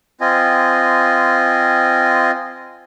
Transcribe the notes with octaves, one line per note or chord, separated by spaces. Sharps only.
C4 F4 D#5 G#5